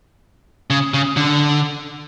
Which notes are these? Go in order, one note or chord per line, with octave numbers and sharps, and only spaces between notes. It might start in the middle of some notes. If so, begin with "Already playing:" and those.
C#3
C#3
D3